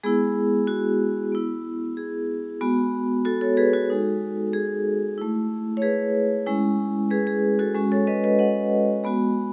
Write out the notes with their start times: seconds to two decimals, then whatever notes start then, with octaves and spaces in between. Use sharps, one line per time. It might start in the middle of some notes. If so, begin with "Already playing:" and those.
0.03 G#3 B3 E4 G#4
0.67 F#4
1.32 B3 E4
1.97 G#4
2.61 G#3 B3 F#4
3.25 F#4 A4
3.41 A4 C#5
3.57 G#4 B4
3.73 F#4 A4
3.89 G#3 D#4 F#4
4.53 G#4
5.18 A3 E4
5.77 C#5
5.82 G#4 B4
6.46 G#3 C#4 E4
7.11 G#4 B4
7.27 G#4
7.59 F#4 A4
7.75 G#3 C#4 F#4
7.92 A4 C#5
8.07 B4 D#5
8.24 B4 D#5
8.39 D#5 F#5
9.04 G#3 B3 F#4